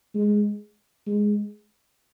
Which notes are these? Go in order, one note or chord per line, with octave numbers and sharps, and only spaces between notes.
G#3
G#3